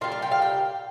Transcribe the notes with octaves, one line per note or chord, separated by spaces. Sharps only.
A#2 G3 F4
F4
G5
F5
G5